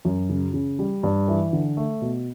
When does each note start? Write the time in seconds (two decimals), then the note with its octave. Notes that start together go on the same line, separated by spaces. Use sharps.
0.05 F#2
0.29 C#3
0.54 C#3
0.79 G3
1.03 G2
1.28 E3
1.53 D3
1.77 A3
2.01 B2